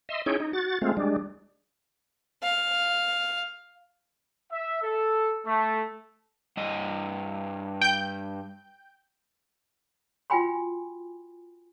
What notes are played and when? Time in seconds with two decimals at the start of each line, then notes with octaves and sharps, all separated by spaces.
0.09 D#5 E5 C6
0.26 C#4 D#4 E4 G#4 C#5 G5
0.40 D#4
0.53 F#4 A6
0.82 G#3 A3 C4 F4
0.97 G3 G#3 D4
2.42 F5
4.51 E5
4.82 A4
5.46 A3
6.57 G2 D#5
7.81 G5 G6
10.30 F4 F#4 G5 G#5 B5 C6